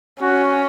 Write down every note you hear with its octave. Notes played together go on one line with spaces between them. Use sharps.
C#4 F#4